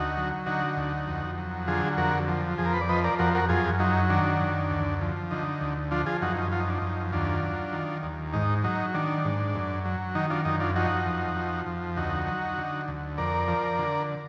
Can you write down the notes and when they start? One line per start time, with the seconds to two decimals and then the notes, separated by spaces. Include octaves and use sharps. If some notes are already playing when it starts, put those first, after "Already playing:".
Already playing: D2 D#4 F#4
0.17 F#3
0.46 D3 D#4 F#4
0.77 D2
1.07 F2
1.38 F#3
1.68 D3 F4 G#4
1.98 F2 F#4 A#4
2.28 F3
2.58 F2 G#4
2.66 A#4
2.74 B4
2.81 D5
2.89 F3 B4 D#5
3.04 A#4 D5
3.19 F2 F#4 A#4
3.35 F#4 A#4
3.49 F#2 F4 G#4
3.80 F#3 D#4
4.10 D#3 D4
4.41 F#2
4.70 D2
5.01 F3
5.31 D3 D#4
5.61 D2
5.91 F3 D4 F4
6.06 F4 G#4
6.22 F#2 D#4 F#4
6.37 D#4
6.52 F3 F4
6.60 D#4
6.70 D4
6.78 F#2 D#4
7.12 D#2 D4 F4
7.43 F#3
7.73 D#3
8.03 D#2
8.33 G#2 D#4
8.64 F#3 D#4
8.94 D#3 D4
9.25 G#2
9.55 F#2
9.85 F#3
10.15 D#3 D#4
10.30 D4 F4
10.45 F#2 D#4
10.60 D4 F4
10.76 F3 D#4 F#4
11.06 F2
11.37 F3
11.66 F2
11.97 D2 D#4 F#4
12.27 F#3
12.58 D3
12.88 D2
13.18 F2 A#4 D5
13.48 F3
13.79 D3